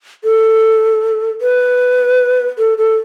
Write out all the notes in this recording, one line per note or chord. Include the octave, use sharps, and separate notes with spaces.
A4
B4
A4
A4